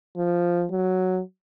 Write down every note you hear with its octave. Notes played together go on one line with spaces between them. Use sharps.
F3
F#3